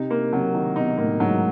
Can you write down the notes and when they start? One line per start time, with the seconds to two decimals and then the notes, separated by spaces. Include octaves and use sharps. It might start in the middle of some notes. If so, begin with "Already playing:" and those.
Already playing: C3 D#4
0.11 A#3
0.32 C3 F#3
0.55 D#3
0.76 B2 D#4
0.98 A2 A#3
1.20 G#2 F#3